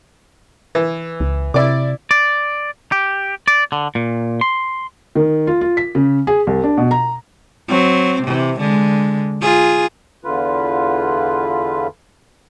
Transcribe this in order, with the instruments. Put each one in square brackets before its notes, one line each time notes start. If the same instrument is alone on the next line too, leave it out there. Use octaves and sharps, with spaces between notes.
[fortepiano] E3
[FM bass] C#2
[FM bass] C3 [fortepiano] E4 D5 D6
[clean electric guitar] D5
G4
D5
D3
A#2
C6
[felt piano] D#3
F4
F4
B6
C#3
G#4
C2
D4
B2
A#5
[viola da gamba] F#3 C4
C3 E3
D3 G#3
F4 G#4
[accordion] E2 D3 F4 B4